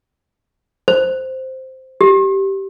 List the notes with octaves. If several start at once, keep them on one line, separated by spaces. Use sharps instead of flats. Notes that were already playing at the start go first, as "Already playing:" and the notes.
C5
G4